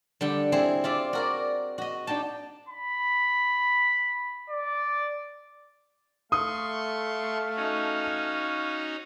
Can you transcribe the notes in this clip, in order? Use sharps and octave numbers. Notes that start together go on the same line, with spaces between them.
D3 G3 G5
C4 E4 G#4
F4 D5 E5
F#4 A#4 D5
F#4 D#5
D4 D#4 G5 A5
B5
D5
A3 F5 C6 C#6 D#6
C#4 D#4 F#4